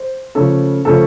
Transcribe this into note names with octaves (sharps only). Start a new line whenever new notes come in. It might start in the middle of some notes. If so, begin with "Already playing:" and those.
Already playing: C5
C#3 F3 A3 C#4 A4
C#3 F3 A3 C#4 A4